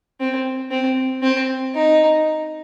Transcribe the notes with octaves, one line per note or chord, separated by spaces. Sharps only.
C4
C4
C4
D#4